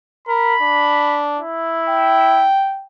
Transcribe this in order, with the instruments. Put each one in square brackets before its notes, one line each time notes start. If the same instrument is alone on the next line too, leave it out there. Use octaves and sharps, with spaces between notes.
[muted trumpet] A#4 [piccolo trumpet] B5
[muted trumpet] D4
[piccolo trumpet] E4
[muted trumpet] G5